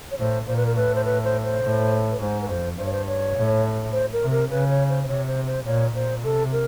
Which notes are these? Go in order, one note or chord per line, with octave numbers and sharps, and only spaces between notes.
C#5
A2 C5
A#2 C5
B4
A#4
A2 B4
C5
B4
C5
C5
A2
B4
G#2 C5
B4
F2 C5
G2 C5
C#5
C5
C#5
A2
C5
A#4
C3
A#4
C#3 B4
C#5
C5
C5
C3 C#5
C5
C5
A#2 C#5
A#2 C5
C3 A4
A#4